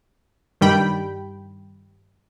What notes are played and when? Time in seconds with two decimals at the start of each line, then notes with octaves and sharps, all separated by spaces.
0.61 G2 D#3 G3 G5 B5